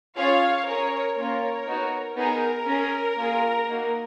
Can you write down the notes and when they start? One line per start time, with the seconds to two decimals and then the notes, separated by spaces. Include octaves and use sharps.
0.16 C#4 F4 G#4 C#5 F5
0.66 C#4 G#4 A#4 C#5
1.16 A#3 C#4 F4 A#4 C#5
1.66 B3 D#4 F#4
2.16 B3 D#4 G#4 A#4
2.66 C#4 G#4
3.16 A#3 F4 G#4
3.66 A#3 D#4 F#4